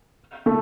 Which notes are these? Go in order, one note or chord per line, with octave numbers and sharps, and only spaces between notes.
A3